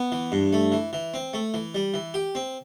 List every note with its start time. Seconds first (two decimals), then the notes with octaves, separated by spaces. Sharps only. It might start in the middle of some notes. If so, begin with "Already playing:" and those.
Already playing: B3
0.12 E3
0.32 G2
0.53 A3
0.72 E3
0.93 E3
1.14 C4
1.33 A3
1.54 E3
1.75 G3
1.94 E3
2.14 G4
2.35 C4